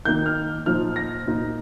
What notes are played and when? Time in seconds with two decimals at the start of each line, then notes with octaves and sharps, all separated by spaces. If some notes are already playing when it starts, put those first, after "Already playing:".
0.05 D#3 A#3 D#4 G6
0.26 F6
0.66 A#2 F3 D#4 F6
0.96 A#6
1.26 A#2 A#3 D#4